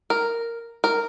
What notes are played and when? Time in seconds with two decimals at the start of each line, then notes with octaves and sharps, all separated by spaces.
0.10 A#4
0.84 A#4